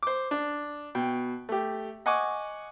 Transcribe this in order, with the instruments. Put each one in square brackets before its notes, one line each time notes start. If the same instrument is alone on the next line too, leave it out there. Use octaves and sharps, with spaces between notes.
[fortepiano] C5 D6
D4
B2 G5
A3 G4
D#5 F#5 G#5 C#6 D6